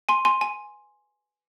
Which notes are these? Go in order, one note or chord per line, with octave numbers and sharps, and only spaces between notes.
G#5 C6
G#5 C6
G#5